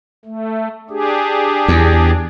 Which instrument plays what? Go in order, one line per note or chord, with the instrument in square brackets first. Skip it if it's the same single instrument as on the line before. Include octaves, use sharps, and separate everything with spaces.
[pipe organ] A3
D4 G4 G#4
[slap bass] E2